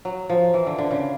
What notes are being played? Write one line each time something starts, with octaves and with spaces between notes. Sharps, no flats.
F#3
F3
E3
D3
D3
C#3